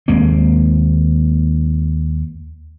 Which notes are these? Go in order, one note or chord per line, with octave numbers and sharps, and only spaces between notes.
D#2 G#3 A#3 C4